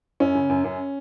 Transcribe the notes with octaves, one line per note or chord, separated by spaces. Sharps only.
F#2 C#4
C#3
F#2
F#2